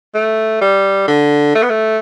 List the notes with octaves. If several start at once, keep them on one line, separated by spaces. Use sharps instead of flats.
A3
G3
D3
A3
B3
A3